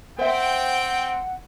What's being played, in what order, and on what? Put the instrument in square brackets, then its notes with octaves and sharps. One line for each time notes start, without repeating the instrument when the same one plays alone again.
[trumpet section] C4 G5 [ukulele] C5 E5 [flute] F#5